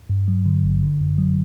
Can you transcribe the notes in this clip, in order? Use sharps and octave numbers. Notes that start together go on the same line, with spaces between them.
G2
F#3
D3
G#1
D3
F#2
F#3